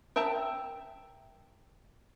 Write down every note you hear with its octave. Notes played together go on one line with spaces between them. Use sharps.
A#4 E5 G5 A5 A#5